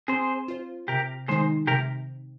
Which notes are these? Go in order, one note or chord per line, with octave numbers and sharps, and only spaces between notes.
C4 G#4 C5
F4 C5
C3 G4 A#4
D#3 G#3 D#4 G#4 C5
C3 G4 A#4